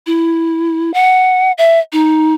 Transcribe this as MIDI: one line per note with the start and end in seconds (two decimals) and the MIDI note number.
0.07 0.94 64
0.94 1.52 78
1.58 1.79 76
1.93 2.34 63